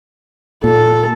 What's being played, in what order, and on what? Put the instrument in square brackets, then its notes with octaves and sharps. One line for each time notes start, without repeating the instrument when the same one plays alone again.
[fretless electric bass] A#2 [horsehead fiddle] A4